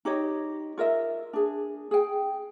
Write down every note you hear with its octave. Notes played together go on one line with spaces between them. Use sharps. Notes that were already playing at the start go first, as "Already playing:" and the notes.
D#4 G4 C#5 D#5
F4 A#4 D#5 E5
D4 G#4
G#4 G5